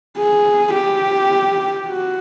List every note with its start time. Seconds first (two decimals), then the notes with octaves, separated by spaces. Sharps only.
0.18 G#4
0.74 G4
1.87 F#4